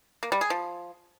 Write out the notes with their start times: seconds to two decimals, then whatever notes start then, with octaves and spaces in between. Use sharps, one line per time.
0.23 A#3
0.32 G3
0.41 G#4
0.50 F3